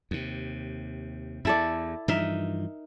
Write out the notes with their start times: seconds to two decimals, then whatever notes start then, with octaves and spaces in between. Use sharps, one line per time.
0.11 D#2 C3
1.45 E2 E4 A4 D5
2.08 G2 E3 F3 D#4 A#4 E5